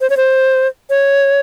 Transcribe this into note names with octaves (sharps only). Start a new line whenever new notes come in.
C5
C#5
C5
C#5